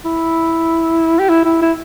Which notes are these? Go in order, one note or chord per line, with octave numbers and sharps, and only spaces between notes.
E4
G4
E4
E4
E4